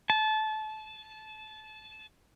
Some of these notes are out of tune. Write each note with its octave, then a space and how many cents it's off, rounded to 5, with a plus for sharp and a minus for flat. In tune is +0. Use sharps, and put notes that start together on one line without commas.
A5 -25